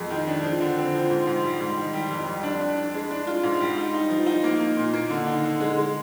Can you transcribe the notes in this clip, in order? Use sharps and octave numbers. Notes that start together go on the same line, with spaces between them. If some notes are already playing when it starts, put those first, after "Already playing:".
Already playing: F2 G#3
D#3
D4
F3
D3
C4
F3
G#2
G#2
G3
G#2
D#3
G3
F2
F2
D4
D4
D4
G#3
D4
F4
G#2
G3
D#4
D#4
F3
D#4
A#3
A#3
A#2
A#3
D3
D#4
D3
G#3
G#3